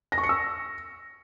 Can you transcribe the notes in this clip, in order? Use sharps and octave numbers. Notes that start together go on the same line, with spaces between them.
A#6
C#6
C#7
E6